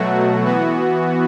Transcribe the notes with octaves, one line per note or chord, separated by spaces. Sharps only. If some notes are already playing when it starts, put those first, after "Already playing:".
Already playing: B2 F#3 A3 F#4
E3 B3 F#4